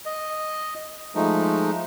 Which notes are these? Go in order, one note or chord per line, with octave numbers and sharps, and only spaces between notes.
D#5
F3 G#3 A3 D#4